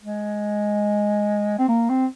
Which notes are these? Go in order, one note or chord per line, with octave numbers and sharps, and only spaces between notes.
G#3
C4
A#3
C4